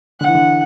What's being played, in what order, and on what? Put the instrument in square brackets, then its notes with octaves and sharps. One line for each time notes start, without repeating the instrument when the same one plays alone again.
[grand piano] D3 [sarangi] F#5
[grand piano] E3
D3